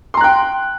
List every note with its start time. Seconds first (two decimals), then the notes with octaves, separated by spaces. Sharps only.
0.14 C6
0.17 A#5
0.21 F#6
0.24 G5